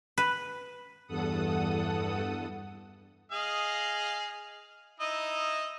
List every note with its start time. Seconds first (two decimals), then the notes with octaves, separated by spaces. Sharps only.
0.18 B4
1.07 E2 G2 A4 F#5 D#6
3.32 G#4 D#5 F5
5.00 D#4 E4 D#5